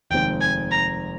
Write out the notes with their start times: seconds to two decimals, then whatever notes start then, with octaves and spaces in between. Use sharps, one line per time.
0.10 F1 D#2 D#3 G#3 C4 G5
0.41 G#5
0.72 A#5